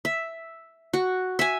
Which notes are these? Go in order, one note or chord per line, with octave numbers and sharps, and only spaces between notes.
E5
F#4
E5 G#5